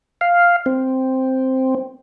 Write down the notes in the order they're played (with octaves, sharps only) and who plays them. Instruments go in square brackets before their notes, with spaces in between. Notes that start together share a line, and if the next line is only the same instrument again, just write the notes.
[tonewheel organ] F5
C4